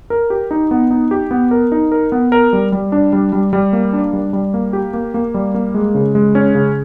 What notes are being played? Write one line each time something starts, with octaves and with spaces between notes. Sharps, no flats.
A#4
G4
D#4
B3
D#4
G4
B3
A#4
D#4
A#4
B3
A#4
G3
G3
D4
G3
G3
G3
A#3
D4
G3
G3
A#3
G4
A#3
A#3
G3
A#3
G#3
C#3
G#3
C#4
C#3